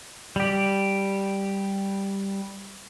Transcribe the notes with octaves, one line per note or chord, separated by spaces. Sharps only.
G3 G4